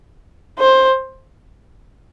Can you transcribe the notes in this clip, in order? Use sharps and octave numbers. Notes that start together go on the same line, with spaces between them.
C5